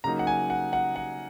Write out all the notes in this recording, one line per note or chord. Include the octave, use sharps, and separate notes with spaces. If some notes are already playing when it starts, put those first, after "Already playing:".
C#3 F#3 A#3 D#4 A#5
F#5
G#5
F#5
F#5
F#5